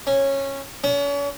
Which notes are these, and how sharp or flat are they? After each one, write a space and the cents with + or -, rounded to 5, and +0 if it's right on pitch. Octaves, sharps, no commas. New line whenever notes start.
C#4 -15
C#4 +40